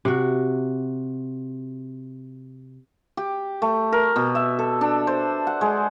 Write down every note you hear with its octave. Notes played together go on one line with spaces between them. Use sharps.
C3 F#4
G4
A3
A#4
B2
E5
A4
D4
C5
F#5
G#3